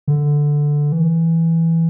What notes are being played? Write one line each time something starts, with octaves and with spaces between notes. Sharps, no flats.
D3
E3